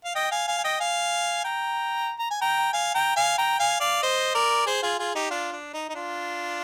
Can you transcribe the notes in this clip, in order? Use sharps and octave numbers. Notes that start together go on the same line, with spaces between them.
F5
D#5 G5
F5 G#5
F5 G#5
G#5
D#5 G5
F5 G#5
G5 A#5
A#5
G#5
G5 A#5
F5 G#5
G5 A#5
F5 G#5
G5 A#5
F5 G#5
D5 F5
C5 D#5
A#4 D5
G#4 C5
F4 G#4
F4 G#4
D#4 G4
D4 F4
D4
D#4
D#4
D4 F4